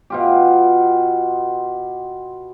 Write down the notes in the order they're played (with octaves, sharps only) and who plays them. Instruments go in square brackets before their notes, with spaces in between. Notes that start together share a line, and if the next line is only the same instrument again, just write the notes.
[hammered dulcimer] B2 F4 G4